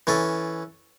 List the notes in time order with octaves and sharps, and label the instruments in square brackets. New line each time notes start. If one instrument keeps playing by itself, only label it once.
[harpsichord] E3 C#4 A4